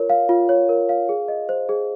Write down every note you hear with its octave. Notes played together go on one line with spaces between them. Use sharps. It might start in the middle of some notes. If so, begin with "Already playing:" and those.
Already playing: F4 A#4 C#5
F5
F4
C#5
A#4
F5
G#4
D#5
C5
G#4